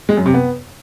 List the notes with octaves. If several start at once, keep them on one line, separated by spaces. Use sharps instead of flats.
G#3
F#2
C3
B3